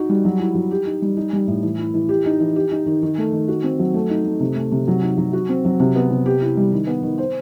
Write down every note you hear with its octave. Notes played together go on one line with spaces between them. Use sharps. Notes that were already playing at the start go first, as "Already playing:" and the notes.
Already playing: D#4 F#4
G3
F#3
E4
F#3
G4
D#4
G3
D#4
G3
A2
E3
E4
E3
G4
D#4
E3
G4
D#4
D#3
D#3
A3
D#3
F#4
C4
F#3
A3
D#4
A3
C3
A3
C3
F#3
D#4
F#3
F#4
C4
F#3
C3
B3
C3
G4
E4
G3
D#3
B3
D#3
C5